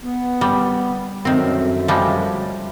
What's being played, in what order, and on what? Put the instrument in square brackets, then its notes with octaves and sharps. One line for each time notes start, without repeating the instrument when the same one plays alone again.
[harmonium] B3
[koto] G3
[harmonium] F#2 A3 [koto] D#3 C4
[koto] F3 G3 G#3